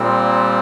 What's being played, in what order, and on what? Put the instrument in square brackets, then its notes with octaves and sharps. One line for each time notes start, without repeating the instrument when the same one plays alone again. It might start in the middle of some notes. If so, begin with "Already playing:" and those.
Already playing: [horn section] A#2 G3 C4